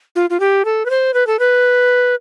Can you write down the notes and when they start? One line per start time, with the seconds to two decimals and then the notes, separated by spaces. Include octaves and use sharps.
0.15 F4
0.30 F4
0.40 G4
0.65 A4
0.85 B4
0.90 C5
1.14 B4
1.27 A4
1.39 B4